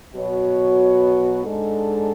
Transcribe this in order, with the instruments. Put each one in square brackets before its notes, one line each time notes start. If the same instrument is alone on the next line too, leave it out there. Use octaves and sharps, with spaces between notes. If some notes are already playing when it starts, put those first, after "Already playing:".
[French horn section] B2 F#3 B3 F#4 C#5
G#2 G#3 D4 A4